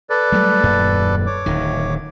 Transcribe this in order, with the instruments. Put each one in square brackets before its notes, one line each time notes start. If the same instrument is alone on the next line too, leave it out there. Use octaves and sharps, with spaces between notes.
[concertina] A4 B4 D5
[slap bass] F#3 G3 A3
D#1 F#2 A#3
[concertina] C#5 D6
[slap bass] D1 D#3